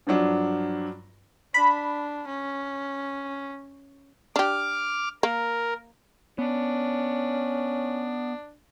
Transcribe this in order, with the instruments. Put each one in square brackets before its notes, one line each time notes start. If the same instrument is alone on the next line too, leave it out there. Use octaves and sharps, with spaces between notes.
[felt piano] G2 F3 F#3 D4
[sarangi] D4 [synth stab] B5
[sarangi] C#4
[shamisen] D4 G4 [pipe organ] D6 F6
[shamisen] A#3 [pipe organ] A#4
[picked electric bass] B3 [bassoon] C#4 [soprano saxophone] D4